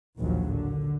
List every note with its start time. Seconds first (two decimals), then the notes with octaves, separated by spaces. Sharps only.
0.18 A#1 D#2 A2 F3 F#3
0.47 D3